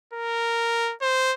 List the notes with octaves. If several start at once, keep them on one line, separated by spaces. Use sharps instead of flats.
A#4
C5